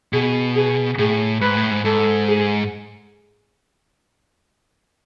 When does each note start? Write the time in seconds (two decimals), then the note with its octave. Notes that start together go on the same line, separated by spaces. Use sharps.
0.13 B2 G#4
0.56 G#4
0.99 A2 G#4
1.41 G#2 B4
1.57 A2
1.71 G#2
1.85 G#2 A4
2.28 G#4